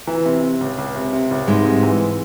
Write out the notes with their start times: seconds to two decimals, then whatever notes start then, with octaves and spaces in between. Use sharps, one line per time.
0.07 E3
0.25 C3
0.43 C3
0.61 C#2
0.78 C#2
0.95 C3
1.13 C3
1.31 C#2
1.47 G#2 C3 G#3
1.65 C3
1.83 E3